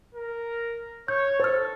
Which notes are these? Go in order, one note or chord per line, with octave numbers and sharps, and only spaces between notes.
A#4
C#5 G6
A4 C5 F6